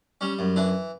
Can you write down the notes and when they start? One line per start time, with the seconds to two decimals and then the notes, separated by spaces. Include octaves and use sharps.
0.21 G3 C#4
0.39 F#2
0.56 E3 D4